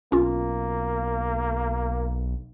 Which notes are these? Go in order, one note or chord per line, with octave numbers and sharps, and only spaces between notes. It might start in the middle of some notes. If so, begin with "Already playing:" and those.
B1 A#3 C#4 F4